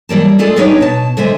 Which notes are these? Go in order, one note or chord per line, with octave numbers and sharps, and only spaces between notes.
E3 G3 A#3 A5
G#3 A3 F4 G#4 A4 D5
B3 D4 D#4 G4 B4 C#5
B2 A5
D3 G#3 C5 E5 G#5